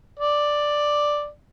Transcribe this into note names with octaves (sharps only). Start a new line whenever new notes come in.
D5